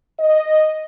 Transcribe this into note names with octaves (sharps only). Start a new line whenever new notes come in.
D#5